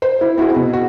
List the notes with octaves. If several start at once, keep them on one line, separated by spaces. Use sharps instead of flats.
C5
E4
C4 E4 F#4 G#4
B2
F#4